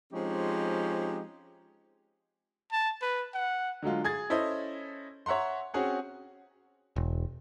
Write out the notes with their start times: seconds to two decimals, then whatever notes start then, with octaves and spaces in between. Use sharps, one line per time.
0.13 F3 G#3 C4 C#4 D#4 G4
2.72 A5
3.02 B4
3.34 F#5
3.82 D3 F#3 G#3 F4
4.04 G#4 G#6 A6
4.30 C#4 E4 A4 C5 D#5
5.26 C#5 E5 F#5 A#5 C6
5.74 C4 C#4 F#4 G#4 F#5
6.96 E1